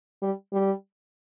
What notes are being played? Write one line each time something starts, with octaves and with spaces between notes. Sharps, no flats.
G3
G3